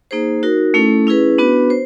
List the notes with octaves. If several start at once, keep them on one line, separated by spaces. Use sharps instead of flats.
A#3 D#4 G#4 C5
D#4 F#4 A#4
A3 C#4 E4 A4
C#4 E4 G#4 B4
B3 D4 F#4 B4
C5